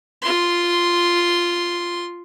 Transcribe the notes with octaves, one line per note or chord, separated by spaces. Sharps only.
F4 C6